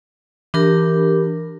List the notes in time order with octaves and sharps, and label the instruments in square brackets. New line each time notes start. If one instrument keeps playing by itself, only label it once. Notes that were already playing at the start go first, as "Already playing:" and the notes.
[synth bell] E3 [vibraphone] D4 G4 A#4